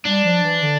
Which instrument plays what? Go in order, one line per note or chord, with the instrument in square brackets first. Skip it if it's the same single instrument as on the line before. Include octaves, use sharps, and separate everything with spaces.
[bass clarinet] G3 [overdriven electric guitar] D4
[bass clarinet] F3
E3
D3